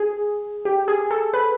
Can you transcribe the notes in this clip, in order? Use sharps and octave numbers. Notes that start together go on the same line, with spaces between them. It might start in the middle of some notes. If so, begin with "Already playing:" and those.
Already playing: G#4
G4
G#4
A4
B4